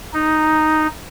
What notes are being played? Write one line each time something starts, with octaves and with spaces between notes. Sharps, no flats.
D#4